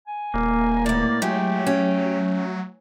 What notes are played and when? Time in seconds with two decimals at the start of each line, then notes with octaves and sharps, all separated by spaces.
0.07 G#5
0.34 D#1 A#3
0.86 A2 B3 D5
1.22 F#3 G#3 A3 G4
1.67 C#4